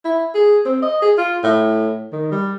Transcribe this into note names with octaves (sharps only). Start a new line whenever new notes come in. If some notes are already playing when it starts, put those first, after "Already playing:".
E4
G#4
C4
D#5
G#4
F4
A2
D#3
G3